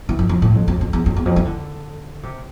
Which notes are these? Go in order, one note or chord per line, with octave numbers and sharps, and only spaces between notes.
E3
F2
F2
A2
F2
F2
F2
E2
F2
E2
F2
E3
D3
C3